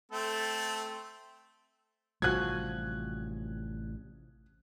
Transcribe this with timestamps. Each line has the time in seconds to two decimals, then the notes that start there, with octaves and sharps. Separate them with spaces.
0.12 A3 C4 A4
2.22 A1 C3 F3 G3 F#4 G#5 F#6 G#6